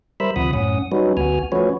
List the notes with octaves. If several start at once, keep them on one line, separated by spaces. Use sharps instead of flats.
G3 A#4 C5 E5 B5 E6
D2 C3 F3 F#5 B5 D#6
F#2 A2 C#4 F#5 D#6
F#3 G3 C#4 D#4 F#4 B4
D2 B3 F#4 G#5 F6
F3 A3 C#4 F#4 B4 C#5